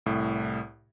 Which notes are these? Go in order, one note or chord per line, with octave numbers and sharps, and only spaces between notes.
C2 A2